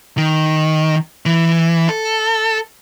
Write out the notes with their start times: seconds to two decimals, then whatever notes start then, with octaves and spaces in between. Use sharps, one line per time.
0.18 D#3
1.26 E3
1.89 A4